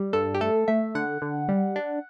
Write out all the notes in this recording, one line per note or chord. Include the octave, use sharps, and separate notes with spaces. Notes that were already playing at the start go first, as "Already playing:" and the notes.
Already playing: G3
G2 A4
G4
A3 A4
A3 E5
D3 F#5
D3
G3
D4